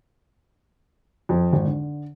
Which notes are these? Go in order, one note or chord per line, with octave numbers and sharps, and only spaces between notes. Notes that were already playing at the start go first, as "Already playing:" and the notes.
F2
G#1
D3